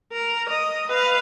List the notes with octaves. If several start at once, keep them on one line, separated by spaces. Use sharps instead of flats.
A#4
D#5
B4 F5